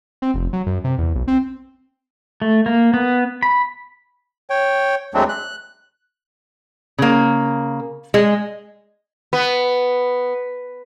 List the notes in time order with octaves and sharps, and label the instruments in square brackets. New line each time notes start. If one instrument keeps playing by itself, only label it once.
[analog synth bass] C4
F1
F#3
F#2
C3
E2
B1
C4
[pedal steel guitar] A3
A#3
B3
B5
[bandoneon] C#5 G5
E2 F#3 G#3 A3 C4 D4
F#6
[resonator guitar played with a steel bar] C#3 A#3
G#3
[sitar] B3